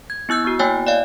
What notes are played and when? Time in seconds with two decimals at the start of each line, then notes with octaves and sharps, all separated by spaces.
0.10 G#6
0.29 B3 E4 E6 G6
0.45 B3 F#4
0.59 A#3 E4 C#5 G5 G#5
0.87 D5 D#5 F5